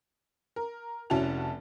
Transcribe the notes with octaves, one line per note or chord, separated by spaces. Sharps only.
A#4
F1 C#4 E4 F#4 A5 F7